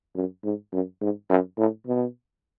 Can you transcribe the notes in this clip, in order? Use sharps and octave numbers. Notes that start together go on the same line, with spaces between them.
F#2
G#2
F#2
G#2
F#2
A2
B2